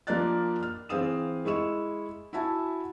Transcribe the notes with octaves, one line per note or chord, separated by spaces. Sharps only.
F3 A#3 D4 D5 F#6 A6
F6
E3 C4 G#4 F5 D#6 E7
G#3 E4 C#6 E7
E4 F#4 E5 G#5 A5